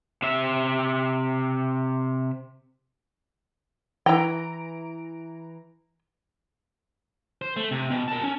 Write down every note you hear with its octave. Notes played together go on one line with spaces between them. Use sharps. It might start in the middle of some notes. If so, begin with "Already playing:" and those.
C3 E5
E3 E4 G5 A#5 D7
C5
A3
C3
B2
A#4 A5
C#4